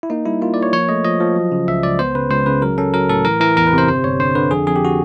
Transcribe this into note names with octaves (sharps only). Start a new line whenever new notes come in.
E4
A#3 D#4
G3 E4
A#3 F4
A#3 D5
C#5
F3 C#5
A3 D#5
F3 D#5
F3
F#3
C#3
C#2 E5
C#2 D5
B3 C5
C#3 B4
C#2 C5
C#3 B4
F#3 A#4
C#4 A4
F#3 A#4
A2 A4
E3 A#4
E3 A#4
E2 A#4
B4
C3 C5
G1 C5
G1 C#5
D3 C5
D3 B4
F2 G#4
F2 G#4
G4
F#4